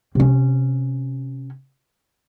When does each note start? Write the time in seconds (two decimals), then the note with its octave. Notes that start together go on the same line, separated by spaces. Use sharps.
0.15 C3 C#4